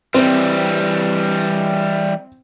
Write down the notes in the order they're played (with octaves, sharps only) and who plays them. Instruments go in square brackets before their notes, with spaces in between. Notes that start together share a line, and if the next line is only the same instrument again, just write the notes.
[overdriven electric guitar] E3 G3 [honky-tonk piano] C4